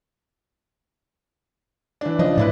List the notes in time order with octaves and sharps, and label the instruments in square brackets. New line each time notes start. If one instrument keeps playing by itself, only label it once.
[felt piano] E3 D4
[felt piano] C#3 D4 D#5 [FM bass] F3
[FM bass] A2 [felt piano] D4 E4 B4